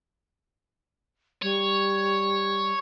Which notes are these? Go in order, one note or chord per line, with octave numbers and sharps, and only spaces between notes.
G3 C#5